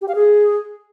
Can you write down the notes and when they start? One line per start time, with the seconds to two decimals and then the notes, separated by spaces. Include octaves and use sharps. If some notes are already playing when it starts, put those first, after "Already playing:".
0.01 G4
0.08 F5
0.15 G#4